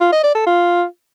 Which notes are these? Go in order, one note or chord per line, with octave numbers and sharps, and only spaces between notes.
F4
D#5
D5
A4
F4